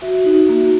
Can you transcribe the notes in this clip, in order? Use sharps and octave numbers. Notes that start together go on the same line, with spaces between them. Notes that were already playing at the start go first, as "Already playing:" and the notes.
F#4 E5
D#4 F#4
A#3 F#4